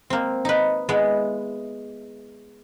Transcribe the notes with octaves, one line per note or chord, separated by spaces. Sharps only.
A#3 C4
D#4 B4
G#3 B3 E4